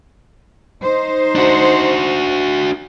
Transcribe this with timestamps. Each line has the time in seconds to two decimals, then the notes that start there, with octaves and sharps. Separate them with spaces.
0.83 D#4 C5
1.35 D4 F#4